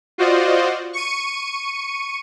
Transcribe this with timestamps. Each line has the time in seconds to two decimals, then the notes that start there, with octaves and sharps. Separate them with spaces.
0.18 F4 F#4 C5 D5 D#5
0.93 C#6 C#7 D#7